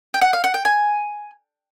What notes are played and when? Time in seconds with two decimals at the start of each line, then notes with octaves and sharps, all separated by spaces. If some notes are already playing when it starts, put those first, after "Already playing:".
0.14 G5
0.21 F#5
0.33 F5
0.44 F#5
0.54 G5
0.65 G#5